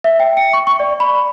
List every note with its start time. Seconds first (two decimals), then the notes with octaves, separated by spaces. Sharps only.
0.04 E5
0.20 G5
0.37 C#7
0.53 C#6
0.67 C#6
0.80 D5
1.00 B5